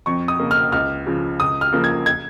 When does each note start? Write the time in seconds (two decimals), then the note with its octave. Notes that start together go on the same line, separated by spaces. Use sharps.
0.06 F2 C#6
0.28 D#6
0.40 C#3 A#3
0.51 F6
0.72 C#2 F6
1.06 C#3 F3
1.40 C#2 D#6
1.61 F6
1.72 C#3 F3 A#3
1.84 G#6
2.06 G#6